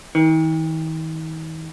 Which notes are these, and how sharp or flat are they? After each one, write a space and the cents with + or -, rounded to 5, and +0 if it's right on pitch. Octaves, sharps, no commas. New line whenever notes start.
D#3 +45